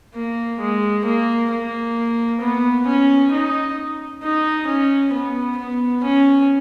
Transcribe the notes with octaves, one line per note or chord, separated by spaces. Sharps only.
A#3
G#3
A#3
A#3
B3
C#4
D#4
D#4
C#4
B3
B3
C#4